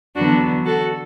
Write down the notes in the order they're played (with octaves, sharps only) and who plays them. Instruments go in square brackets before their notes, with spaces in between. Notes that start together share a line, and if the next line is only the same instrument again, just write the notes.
[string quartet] E2 D3 F#3 B3 D4 F#4
F#4 A4